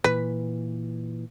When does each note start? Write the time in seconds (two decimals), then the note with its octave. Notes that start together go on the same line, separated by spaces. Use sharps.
0.04 A#2 E3 B4